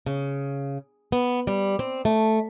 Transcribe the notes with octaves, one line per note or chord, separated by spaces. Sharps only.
C#3
B3
G3
C4
A3